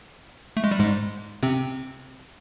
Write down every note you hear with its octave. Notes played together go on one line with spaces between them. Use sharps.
A3
G#3
G3
G#2 G#3
C3 C4